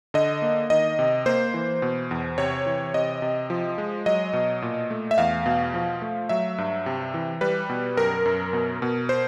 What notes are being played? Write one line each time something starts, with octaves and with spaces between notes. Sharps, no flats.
D3 D#5
A#3
D#3 D#5
C3
A#3 C5
E3
B2
E2
C3 C#5
E3
C3 D#5
C3
F3
G#3
F#3 D#5
B2
A#2
A3
E5
E2 F5
B2
F3
A3
F#3 E5
G2
C3
E3
G3 B4
B2
F#2 A#4
F#2
B2
B2
C5